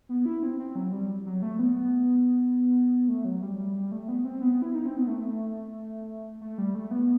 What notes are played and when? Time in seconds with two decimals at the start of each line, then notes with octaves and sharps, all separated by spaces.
0.09 B3
0.26 E4
0.43 C4
0.59 C4
0.75 F#3
0.92 G3
1.26 F#3
1.42 A3
1.59 B3
1.76 B3
3.08 A3
3.25 F#3
3.42 G3
3.58 G3
3.75 G3
3.92 A3
4.08 B3
4.25 C4
4.42 B3
4.62 E4
4.74 D#4
4.86 C4
4.97 B3
5.08 A3
6.41 A3
6.58 G3
6.75 A3
6.91 B3